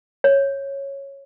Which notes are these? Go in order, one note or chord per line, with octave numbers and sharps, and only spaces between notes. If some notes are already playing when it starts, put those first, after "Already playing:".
C#5